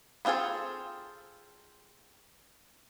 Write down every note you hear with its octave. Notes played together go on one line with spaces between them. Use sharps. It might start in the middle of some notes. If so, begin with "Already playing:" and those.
B3 C4 F4 G#4 A4